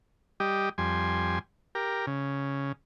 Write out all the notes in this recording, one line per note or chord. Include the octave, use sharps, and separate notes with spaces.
G3 G4 D#5
F2 G3 G#5 C6
G4 A#4
C#3